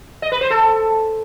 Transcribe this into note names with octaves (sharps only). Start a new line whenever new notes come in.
D#5
B4
C5
A4